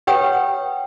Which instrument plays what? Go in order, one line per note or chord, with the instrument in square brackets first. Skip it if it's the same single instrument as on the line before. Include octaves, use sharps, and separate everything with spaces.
[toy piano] G4 B4 C#5 F#5 G5 D#6